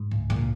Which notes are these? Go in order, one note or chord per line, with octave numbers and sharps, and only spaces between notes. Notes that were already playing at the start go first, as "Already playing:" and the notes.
Already playing: G#2
C#2 A2
C#2 A#2